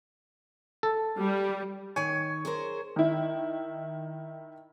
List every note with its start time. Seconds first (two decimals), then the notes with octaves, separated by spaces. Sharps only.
0.83 A4
1.18 G3
1.96 D#3 C#5 G#5
2.45 G#4 A#4 C5
2.96 D#3 E4